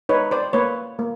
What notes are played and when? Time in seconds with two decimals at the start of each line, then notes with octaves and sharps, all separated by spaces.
0.09 D#4 B4 C#5
0.31 C5 D5
0.53 A#3 B4 C#5
0.99 A#3